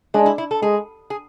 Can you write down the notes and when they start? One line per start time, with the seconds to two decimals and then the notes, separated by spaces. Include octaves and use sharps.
0.14 G#3 D4
0.26 E4
0.38 E4
0.51 A4
0.62 G#3 G#4
1.10 G#4